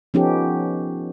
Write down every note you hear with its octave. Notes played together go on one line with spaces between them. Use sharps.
F3 B3 C#4 D#4 G4 A4